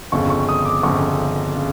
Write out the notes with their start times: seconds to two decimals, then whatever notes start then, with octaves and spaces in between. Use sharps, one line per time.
0.12 G1 F2 C#3 C#6
0.30 C#6
0.49 D#6
0.66 D6
0.83 G1 F2 C#3 C#6
1.55 C#3